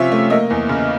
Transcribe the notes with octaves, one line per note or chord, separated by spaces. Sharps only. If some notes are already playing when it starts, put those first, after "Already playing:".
Already playing: C3 F3 C#4 E5 F5
A3
A#3 D#5
E2
C#3